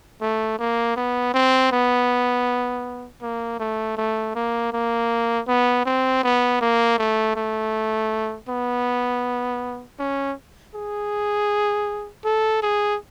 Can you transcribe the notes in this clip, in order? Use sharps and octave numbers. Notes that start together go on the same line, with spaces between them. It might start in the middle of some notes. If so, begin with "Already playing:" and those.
A3
A#3
B3
C4
B3
A#3
A3
A3
A#3
A#3
B3
C4
B3
A#3
A3
A3
B3
C#4
G#4
A4
G#4